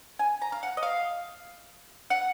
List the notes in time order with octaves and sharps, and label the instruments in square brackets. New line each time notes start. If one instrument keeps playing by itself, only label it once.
[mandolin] G#5
A#5
F5
F#5
D#5
F5
F#5